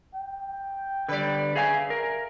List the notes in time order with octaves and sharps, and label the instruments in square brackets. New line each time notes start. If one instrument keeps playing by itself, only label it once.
[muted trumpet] G5
[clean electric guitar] D3 G3 [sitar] B4 D5
[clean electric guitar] G#4 F5 G#5 [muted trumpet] E5
[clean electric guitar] A#4